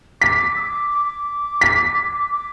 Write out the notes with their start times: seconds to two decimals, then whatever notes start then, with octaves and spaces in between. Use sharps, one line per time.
0.21 D6 B6
0.56 E6
0.60 D6
0.91 D6
1.61 B6
2.32 D6